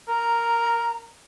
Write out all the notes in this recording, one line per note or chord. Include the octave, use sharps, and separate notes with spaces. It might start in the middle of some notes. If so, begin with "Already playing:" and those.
A#4 A#5